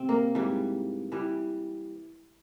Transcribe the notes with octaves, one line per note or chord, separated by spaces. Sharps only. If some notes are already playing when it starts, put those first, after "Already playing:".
Already playing: C3 C4
A#3
G#2 E3 G3
E3 G3